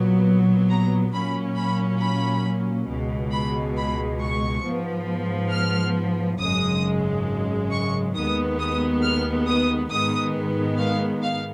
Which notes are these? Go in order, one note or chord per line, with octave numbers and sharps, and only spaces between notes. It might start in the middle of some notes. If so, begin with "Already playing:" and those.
Already playing: A#1 A#2 F#3 B3
A#5
A#2 F#3 A#3 C#4 B5
B5
B5
C#2 B2 G#3
B5
B5
C#6
G#2 F3 B3
F6
G#1 F#2 C#3 G#3 D#6
C#6
D#2 D#3 G#3 B3 D#6
D#6
F6
D#6
G#2 D#3 G#3 B3 D#6
F5
F5